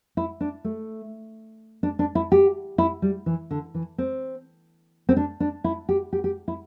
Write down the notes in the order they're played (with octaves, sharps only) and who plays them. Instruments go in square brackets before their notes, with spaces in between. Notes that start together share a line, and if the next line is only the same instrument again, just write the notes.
[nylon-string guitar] E4
D4
A3
D4
D4
E4
G4
E4
G3
E3
D3
E3
C4
C4
D4
D4
E4
G4
G4
G4
E4